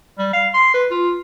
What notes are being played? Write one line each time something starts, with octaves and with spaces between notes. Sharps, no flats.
G3
F5
C6
B4
F4